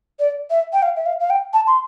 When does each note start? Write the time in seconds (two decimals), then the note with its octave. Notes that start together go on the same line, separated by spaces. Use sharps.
0.19 D5
0.50 E5
0.73 G5
0.83 F5
0.96 E5
1.06 F5
1.20 F5
1.30 G5
1.53 A5
1.67 C6